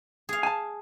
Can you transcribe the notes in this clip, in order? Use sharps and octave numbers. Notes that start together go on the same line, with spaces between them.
G#4 F5
G#5 A5